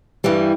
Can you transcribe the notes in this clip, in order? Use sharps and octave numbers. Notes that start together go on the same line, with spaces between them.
G2 E3 G3